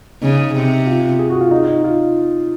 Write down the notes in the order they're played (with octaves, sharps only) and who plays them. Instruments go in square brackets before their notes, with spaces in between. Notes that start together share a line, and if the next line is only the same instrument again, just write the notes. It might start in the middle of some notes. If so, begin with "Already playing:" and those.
[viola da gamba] C#3 [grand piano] D#4
[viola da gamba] C3
[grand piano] F4
G#4
F#4
F4
D#4
D#4
F4